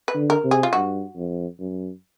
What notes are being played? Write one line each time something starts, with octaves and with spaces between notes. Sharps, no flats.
B4
D3
A#4
C3
G#4
F4
G2 F#4
F2
F#2